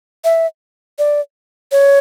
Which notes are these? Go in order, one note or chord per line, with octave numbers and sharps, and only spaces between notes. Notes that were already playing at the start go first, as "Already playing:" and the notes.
E5
D5
C#5